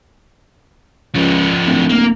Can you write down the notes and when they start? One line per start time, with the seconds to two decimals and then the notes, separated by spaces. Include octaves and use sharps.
1.15 C#2 F3 C#4
1.66 D1
1.90 A#3